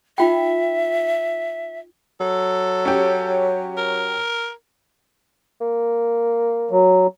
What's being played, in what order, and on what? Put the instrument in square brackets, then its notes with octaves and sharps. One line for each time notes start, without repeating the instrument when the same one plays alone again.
[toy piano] D#4 F4 G5 [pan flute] E5
[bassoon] F#3 [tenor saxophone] A4
[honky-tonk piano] C#4 G4
[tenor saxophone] A#4
[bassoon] A#3
[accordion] F#3